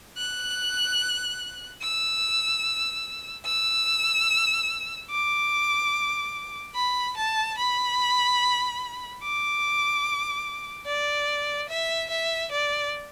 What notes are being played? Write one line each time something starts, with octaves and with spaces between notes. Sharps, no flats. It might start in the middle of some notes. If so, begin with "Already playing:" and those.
F#6
E6
E6
D6
B5
A5
B5
D6
D5
E5
E5
D5